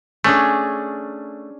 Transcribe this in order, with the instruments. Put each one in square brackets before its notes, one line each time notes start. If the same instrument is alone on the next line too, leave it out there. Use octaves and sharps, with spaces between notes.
[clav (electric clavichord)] A3 [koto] C#4 D4 G#4